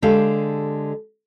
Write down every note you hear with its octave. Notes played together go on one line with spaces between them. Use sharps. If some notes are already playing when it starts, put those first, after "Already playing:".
D3 G#3 G4 A4 F5